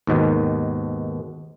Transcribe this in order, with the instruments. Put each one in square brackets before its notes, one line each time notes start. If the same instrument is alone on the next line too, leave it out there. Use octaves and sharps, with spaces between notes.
[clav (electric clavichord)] D#2 G#2 B2 D#3